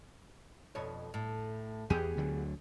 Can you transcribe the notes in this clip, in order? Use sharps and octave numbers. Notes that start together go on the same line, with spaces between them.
F2 B2 C#5
A2
E2 B3 G4 G#4
D2 D3 F#3